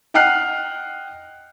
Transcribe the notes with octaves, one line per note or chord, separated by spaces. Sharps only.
D#5 F#5 G5 F6 F#6 C7